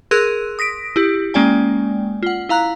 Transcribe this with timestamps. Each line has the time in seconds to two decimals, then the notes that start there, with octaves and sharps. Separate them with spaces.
0.11 G#4 A#4 C6 E6 F#6
0.59 D#6 A#6 B6 D7
0.96 E4 G4
1.34 G#3 A#3 C#4 D5 G5 G#5
2.23 F4 F#5
2.49 E4 F5 A#5 F#6